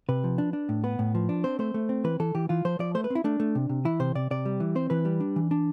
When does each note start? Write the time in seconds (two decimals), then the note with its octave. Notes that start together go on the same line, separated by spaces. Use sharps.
0.09 C3 B4
0.24 F3
0.38 D4
0.53 D4
0.69 A2
0.84 B3 B4
0.99 A2
1.15 F3
1.29 D4
1.44 C4 C5
1.59 A3 C5
1.74 A3
1.89 C4
2.04 E3 B4
2.20 E3 A4
2.35 E3 G4
2.49 E3 F4
2.65 F3 C5
2.79 F3 D5
2.95 A3 C5
3.04 B4
3.10 C4
3.15 E4
3.24 A3 D4
3.40 A3
3.55 C3
3.69 C3
3.85 E3 E4
4.00 C3 C5
4.15 C3 D5
4.31 C3 D5
4.46 G3
4.60 E3
4.75 C4 C5
4.90 E3 B4
5.05 G3
5.20 D4
5.36 E3
5.51 D4